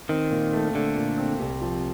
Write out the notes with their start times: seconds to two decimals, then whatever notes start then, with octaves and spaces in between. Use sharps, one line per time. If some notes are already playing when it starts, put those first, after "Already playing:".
0.09 D#3 C4
0.31 A#2
0.53 A3
0.75 D3 A3
0.96 A#2
1.18 C4
1.40 C2 C3
1.61 F3